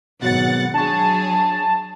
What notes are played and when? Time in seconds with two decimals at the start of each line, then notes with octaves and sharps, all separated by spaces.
0.22 G#1 B2 F#3 B3 F#5 A6
0.74 F#3 D4 G#4 A5 C#6